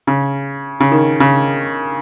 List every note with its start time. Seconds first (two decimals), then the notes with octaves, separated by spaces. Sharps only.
0.07 C#3
0.80 C#3
0.92 D#3
1.20 C#3